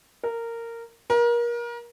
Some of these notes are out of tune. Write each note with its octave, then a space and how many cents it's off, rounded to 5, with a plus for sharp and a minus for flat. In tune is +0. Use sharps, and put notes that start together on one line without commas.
A#4 -15
A#4 +30